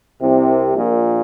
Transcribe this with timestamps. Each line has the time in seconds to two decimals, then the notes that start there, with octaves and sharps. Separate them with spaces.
0.21 C2 C3
0.75 A#1 A#2